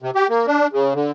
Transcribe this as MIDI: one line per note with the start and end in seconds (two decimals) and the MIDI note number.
0.02 0.11 48
0.15 0.27 67
0.30 0.46 58
0.47 0.67 62
0.73 0.94 49
0.95 1.11 50